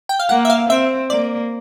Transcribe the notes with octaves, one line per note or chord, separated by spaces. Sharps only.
G5
F5
A#3 F#5
E5
F5
C4 E5
A#3 D5